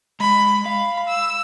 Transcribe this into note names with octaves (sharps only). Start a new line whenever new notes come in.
G#3 B5
F5 B5
E6